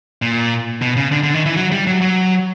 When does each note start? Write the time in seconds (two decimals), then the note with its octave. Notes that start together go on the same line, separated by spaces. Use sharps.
0.22 A#2
0.82 B2
0.97 C#3
1.12 D3
1.23 D3
1.34 D#3
1.46 E3
1.56 F#3
1.72 G3
1.87 F#3
2.02 F#3